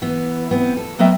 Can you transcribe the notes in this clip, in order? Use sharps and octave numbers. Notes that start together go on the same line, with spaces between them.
E3 B3
B3 C4
A4
F#3 B3 A#4 D#5 E5 G5